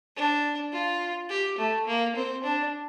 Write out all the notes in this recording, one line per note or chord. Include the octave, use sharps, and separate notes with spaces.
D4
F4
G4
A3
A#3
C4
D4